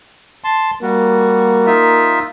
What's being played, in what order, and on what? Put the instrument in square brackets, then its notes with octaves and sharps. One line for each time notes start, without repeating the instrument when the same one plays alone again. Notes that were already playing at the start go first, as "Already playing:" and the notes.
[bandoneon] A5 C6
[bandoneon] G3 F#4 [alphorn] A#3
[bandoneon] D#4 F4 E5